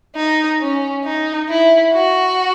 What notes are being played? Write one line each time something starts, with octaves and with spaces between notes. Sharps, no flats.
D#4
C#4
D#4
E4
F#4